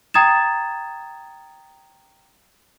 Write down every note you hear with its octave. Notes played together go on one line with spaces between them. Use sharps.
G5 A#5 D#6 G#6 A6 E7